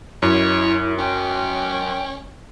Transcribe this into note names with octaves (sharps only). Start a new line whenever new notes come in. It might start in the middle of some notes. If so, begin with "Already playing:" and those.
F#2 E4 C#5
C#4 G5